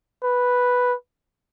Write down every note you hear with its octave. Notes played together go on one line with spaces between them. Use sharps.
B4